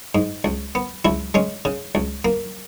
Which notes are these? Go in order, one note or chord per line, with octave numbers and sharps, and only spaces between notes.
G#2
C#2
B3
C#2 E4
G#3 C#4
C#3
C#2
A#3